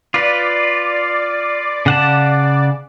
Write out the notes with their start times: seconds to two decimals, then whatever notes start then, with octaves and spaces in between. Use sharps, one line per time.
0.14 F4 B4 D5
1.86 C#3 F#5 A5